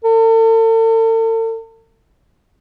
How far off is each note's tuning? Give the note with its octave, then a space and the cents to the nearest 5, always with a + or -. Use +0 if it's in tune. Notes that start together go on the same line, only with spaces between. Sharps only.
A4 +40